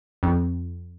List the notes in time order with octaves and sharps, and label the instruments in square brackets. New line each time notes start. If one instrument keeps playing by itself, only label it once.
[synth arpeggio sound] F2